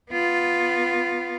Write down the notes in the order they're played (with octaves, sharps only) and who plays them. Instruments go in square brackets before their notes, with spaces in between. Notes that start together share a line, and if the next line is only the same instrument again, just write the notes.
[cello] B3 F4